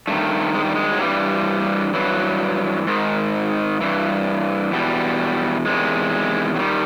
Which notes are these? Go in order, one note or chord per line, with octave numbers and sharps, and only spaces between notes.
G2 D#3 A3
G#3
G3
G#3
F#3
G2 E3 G3
G2 E3 F#3
G#2 D#3
G2 E3
E2 B2 G3
E2 C3 D#3 G#3
F#3
D#3 G3